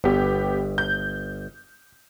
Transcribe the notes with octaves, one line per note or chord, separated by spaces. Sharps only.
G1 B3 G4
G6